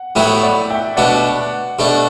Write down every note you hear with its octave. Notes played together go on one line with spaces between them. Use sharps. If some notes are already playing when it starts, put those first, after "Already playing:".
Already playing: F#5
A2 F#3 B3 E4 E5 G5
D5 F#5
E5 G5
B2 A3 D4 D5 F#5
B2 A3 D4